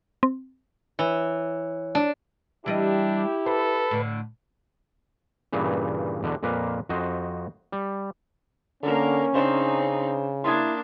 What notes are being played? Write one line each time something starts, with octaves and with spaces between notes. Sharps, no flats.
C4
E3 C#5
D4
E3 G3 D4 E4 G4 D#5
A4 B4 C5
A2 D3
G2 A#2 C#3 E3
E2 B2 D3
F2 A#2 A#3 B4 F5
F2 F#4 C5 D#5
G3
D3 A#3 C#4 A#4
C#3 C4 D4 D#4 C5
A#3 D4 E4 C6 D#6 G#6